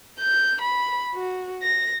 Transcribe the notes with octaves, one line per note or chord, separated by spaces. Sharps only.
G6
B5
F#4
A#6